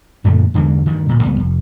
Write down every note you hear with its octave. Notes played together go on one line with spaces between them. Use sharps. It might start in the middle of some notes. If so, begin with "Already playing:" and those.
F#2 A#2 D3 A3
E2 D3 E3 G#3
D2 G2 D#3
D1 A#2
C#2 G3 B3
F1